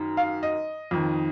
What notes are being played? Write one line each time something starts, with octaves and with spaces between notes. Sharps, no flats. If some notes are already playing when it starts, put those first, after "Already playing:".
Already playing: F#2 D#3
F5
D#5
F2 D#3